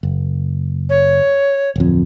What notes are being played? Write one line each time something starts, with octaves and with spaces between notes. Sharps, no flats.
F#1
C#5
D1 F2